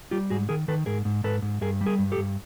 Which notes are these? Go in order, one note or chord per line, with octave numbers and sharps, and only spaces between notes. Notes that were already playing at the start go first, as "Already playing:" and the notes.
G3 F4 G4
G#2 F#4 G#4
D#3 G#4 A#4
D#3 A4 B4
G#2 G#4 A#4
G#2
G#2 A4 B4
G#2
G2 G#4 A#4
G3
G#4 A#4
G2
G4 A4
G2